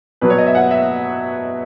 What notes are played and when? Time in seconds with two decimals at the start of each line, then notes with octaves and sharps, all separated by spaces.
0.21 B2 F#3 B3 B4
0.30 C#5
0.38 D#5
0.47 E5
0.55 F#5
0.71 E5